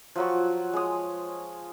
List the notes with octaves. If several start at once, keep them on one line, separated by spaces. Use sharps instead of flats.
F3 F#3 C#6
G#3 C#5 D#6